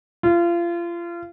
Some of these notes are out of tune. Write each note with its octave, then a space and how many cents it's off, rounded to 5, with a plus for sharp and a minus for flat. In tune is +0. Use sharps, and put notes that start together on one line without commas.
F4 -30